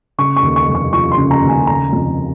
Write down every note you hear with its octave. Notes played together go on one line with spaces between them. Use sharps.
C#3 C#6
C#6
D#2
C#6
F1
C#6
F3 C#6
C6
C#3
A#5
D#2
G#5
C#3 A#5
F2